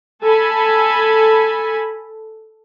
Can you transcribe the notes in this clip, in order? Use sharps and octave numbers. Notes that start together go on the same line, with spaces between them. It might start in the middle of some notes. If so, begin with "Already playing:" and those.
A4 G#5 B5